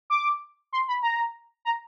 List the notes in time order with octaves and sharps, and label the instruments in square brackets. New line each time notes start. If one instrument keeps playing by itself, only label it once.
[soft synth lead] D6
C6
B5
A#5
A#5